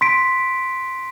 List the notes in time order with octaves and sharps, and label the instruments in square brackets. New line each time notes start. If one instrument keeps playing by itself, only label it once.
[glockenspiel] C6 B6 D7